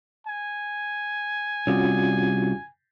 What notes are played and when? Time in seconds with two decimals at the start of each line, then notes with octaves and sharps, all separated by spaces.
0.27 G#5
1.67 C2 C#4 F4 F#4